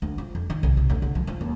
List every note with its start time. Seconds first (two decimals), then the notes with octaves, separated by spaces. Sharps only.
0.02 D2
0.18 F3
0.35 F2
0.50 D#3
0.63 C2
0.77 C3
0.90 D2
1.02 D3
1.15 F3
1.27 F3
1.41 D#2